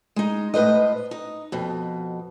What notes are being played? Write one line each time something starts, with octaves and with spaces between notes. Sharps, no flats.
G#3 D#4
A2 B4 C5 D#5
D#4
F2 B2